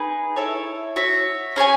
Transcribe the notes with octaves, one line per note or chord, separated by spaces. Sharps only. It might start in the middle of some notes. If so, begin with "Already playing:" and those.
Already playing: D#4 G#4 B4
E4 A4 C#5
F#4 C#5 E5
C#4 G#4 C#5 G#5